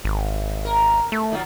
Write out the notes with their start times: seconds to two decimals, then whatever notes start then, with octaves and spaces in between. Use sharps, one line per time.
0.05 G#1
0.65 A#4
1.12 A3
1.31 D#3 F#3 F4